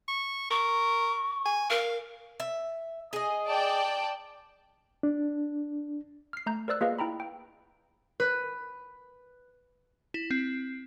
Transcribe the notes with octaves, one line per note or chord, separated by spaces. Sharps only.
C#6
A#4 C#6
G#5
A#4 F5
E5
G#4 D#5
D5 G5 A5
D4
F6 C7
A3 A#5 G6
A#4 C5 D5 E6 F#6
A#3 F4 G#4 B4 D#5 F5
E4 G5 A#5 B5
G5
B4
E4
C4